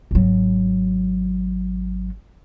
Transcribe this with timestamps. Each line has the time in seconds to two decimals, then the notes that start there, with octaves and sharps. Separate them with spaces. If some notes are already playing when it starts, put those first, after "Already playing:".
0.11 G#1 F#3